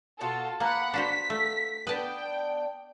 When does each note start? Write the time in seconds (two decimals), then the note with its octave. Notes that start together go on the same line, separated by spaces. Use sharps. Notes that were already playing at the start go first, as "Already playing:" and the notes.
0.21 B2 F4 F#4 A4
0.60 A#3 B3 F5 F#5 A#5 B5 F#6
0.94 D4 F#4 C5 B6
1.30 A3
1.87 B3 D4 B4 G5 A5